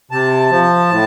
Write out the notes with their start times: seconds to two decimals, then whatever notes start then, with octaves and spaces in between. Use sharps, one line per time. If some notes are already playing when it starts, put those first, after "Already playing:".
0.11 C3 A5
0.51 F3
0.91 A2